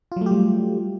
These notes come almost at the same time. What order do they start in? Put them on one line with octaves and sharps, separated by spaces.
F4 F#3 A3 G4 G3